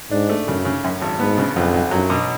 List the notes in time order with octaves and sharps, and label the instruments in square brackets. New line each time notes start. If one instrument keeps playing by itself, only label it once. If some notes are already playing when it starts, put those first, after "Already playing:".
[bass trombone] G#2 [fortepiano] D4
[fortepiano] A3
[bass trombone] F#2 [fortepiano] C#3
[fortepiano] C#3
F#2
G#1
[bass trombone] G#2 [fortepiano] B3
[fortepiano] C#3
[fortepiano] B1 [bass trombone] F2
[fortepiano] B1
[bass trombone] F#2 [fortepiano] F#3
[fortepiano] B2